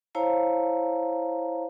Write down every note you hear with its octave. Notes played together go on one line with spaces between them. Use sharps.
E4 C5 C#5 F5 A5 A#5